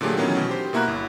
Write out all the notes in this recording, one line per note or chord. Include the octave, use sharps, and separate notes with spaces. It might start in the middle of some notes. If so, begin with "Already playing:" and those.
A#2 D3 F#3 A3 G4 G#4
D#3 E3 F#3 B3 C#4
B2
G4 C5
B2 A#3 E4 F#4 A#5 F#6
G1